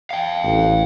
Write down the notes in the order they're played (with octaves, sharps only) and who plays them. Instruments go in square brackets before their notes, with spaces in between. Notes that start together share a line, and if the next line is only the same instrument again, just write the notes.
[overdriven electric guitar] F5 G5
[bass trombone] A1